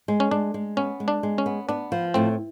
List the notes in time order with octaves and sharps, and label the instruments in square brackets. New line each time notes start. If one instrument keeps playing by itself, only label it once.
[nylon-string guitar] G#3
[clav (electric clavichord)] C#4
[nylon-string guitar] G#3 [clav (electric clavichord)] D4
[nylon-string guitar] G#3
[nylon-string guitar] B3 [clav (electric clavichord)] C#4
[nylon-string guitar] G#3
[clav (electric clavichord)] D4
[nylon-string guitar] G#3
[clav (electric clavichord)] C#4
[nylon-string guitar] B3
[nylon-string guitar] B3 [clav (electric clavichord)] D4
[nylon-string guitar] F3
[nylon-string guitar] A2 [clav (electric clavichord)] C4